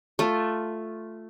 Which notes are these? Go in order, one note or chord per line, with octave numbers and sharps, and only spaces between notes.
A3 F4